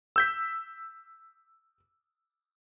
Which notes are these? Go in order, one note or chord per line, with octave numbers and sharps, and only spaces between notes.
E6 G6 B6